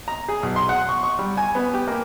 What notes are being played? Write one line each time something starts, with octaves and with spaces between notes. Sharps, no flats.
A#5
G#4
B1
C6
F#5
C#6
C#6
G3
G#5
B3
G4
A#3